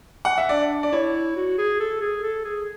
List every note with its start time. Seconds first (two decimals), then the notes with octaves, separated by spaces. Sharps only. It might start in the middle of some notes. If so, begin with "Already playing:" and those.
0.25 F#5
0.38 E5
0.49 D4 D5
0.83 D5
0.93 E4 C#5
1.36 F#4
1.58 G#4
1.80 A4
2.01 G#4
2.23 A4
2.45 G#4